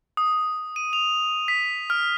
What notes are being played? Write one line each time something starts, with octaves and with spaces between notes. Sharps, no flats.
D#6
D#7
F7
B6
F6